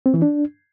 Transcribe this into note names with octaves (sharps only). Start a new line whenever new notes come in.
C4
E3
D4